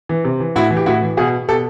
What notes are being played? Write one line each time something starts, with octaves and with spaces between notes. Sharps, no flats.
E3
C3
E3
A2 E4 F#4
E3
G4
A2 E4 F#4
E3
B2 F#4 G#4
B2 G4 A4